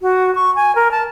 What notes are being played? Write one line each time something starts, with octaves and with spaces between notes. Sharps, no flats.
F#4
C#6
G#5
A#4
A5